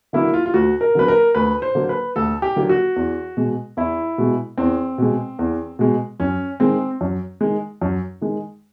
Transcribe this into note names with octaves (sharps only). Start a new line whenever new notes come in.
D3 F#3 A#3 E4
F4
F4
D2 F#4
A#4
D3 F#3 A#3 B4
A#4
D2 B4
C5
D3 F#3 A#3
B4
D2 A4
G4
D3 F#3 A#3
F#4
E2
B2 G#3
E2 E4
B2 G#3
E2 C4
B2 G#3
E2
B2 G#3
F#2 C#4
D#3 G#3 C4
F#2
D#3 G#3
F#2
D#3 G#3